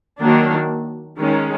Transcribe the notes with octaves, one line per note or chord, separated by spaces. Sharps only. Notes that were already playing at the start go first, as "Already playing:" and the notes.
D#3 F#3 A#3 D4
D#3 G#3 C#4